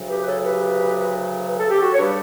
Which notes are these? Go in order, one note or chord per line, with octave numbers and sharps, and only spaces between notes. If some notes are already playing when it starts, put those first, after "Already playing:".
Already playing: D2 C#3 F#3
G4 B4
B4
A4 C#5
G4 B4
B4
A4
G4
F#4 A4
C#5
C#3 G3 D4 G4 B4